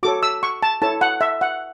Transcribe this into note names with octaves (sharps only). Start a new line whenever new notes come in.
F#4 A4 C#5 D6
E6
C#6
A5
E4 A4 C#5 A5
F#5
E5
F#5